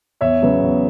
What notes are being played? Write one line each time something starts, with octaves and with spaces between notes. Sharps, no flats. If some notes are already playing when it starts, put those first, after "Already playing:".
E2 C#5 E5
C#3 F#3 B3
E2